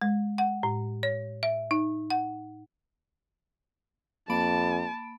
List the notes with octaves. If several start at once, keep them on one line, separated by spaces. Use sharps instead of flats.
G#3
F#5
A2
C#5
E5
D#4
F#5
F2 A#3 A5 B5 D7